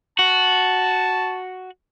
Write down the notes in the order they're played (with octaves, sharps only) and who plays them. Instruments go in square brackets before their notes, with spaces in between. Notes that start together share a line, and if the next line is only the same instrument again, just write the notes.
[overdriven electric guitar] F#4 [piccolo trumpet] A5